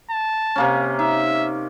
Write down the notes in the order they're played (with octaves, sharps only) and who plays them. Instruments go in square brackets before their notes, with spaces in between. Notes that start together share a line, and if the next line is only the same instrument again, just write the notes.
[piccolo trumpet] A5
[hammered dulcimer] C3 A#3 C#4
[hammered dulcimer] D#4 [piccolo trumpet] E5